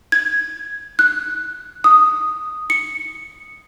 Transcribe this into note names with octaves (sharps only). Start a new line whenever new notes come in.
G#6
F#6
D#6
C#7